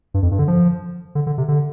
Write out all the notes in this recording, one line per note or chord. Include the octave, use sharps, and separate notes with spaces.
G2
F2
G2
D3
F3
D3
D3
C3
D3